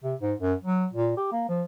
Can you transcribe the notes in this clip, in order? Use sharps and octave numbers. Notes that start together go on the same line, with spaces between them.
C3
G#2
F#2
F#3
A#2
G4
A#3
F3